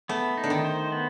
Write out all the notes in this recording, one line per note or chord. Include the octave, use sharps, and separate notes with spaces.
A3 B3
D#4
D3
D#3
C5
B3